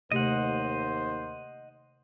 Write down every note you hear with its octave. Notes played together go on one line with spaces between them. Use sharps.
D#2 C3 A3 G4 C5 D#5 F#5